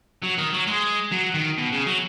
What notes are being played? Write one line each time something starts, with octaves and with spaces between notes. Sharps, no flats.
F#3
D#3
F#3
G#3
F#3
D#3
B2
C#3
F#3